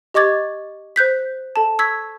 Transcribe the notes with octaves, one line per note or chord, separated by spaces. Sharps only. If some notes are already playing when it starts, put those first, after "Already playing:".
G4 D#5 C#6 D6 G#6 A6
C5 F#6 G6 B6
A4 A5
C#6 E6 G#6 B6